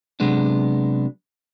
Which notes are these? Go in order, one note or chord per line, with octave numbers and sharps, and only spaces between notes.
C3 F#3 G#3 B3 D4